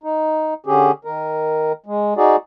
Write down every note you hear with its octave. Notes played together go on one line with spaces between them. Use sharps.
D#4
D3 C#4 G4 G#4
D#3 A#4
G#3
D#4 F#4 G#4 D5